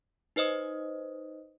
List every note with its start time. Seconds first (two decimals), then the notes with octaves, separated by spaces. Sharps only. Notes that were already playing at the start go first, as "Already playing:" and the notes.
0.36 D#4 B4 C5 D#5 D#6